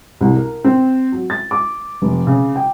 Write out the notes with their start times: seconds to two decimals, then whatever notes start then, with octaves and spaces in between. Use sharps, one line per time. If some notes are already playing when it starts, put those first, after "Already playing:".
0.21 C2
0.36 A#4
0.64 C4
1.12 F#3
1.30 A6
1.51 D6
2.02 F1
2.27 C#3
2.56 G5